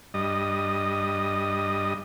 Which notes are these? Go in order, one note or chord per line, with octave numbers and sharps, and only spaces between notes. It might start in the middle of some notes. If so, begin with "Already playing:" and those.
G2 D#5